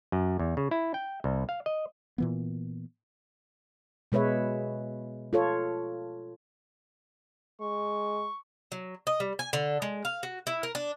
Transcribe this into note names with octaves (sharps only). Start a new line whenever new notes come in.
F#2
E2
C#3
E4
G5
C2
F5
D#5
A#2 E3 B3
B2 G#3 B4 C#5 E5
F4 A4 C#5
G#3 C#6
F#3
D#5
G3
G#5
D3
G#3
F5
F#4
E4
A#4
D4